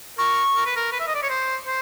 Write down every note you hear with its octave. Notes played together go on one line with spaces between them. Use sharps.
A#4 C#6
A#4
B4
A#4
B4
E5
D#5
D5
C#5
C5
C5